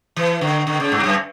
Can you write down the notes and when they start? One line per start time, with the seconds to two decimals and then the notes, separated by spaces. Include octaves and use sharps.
0.16 E3
0.41 D3
0.67 D3
0.80 C#3
0.92 G2
1.04 F#2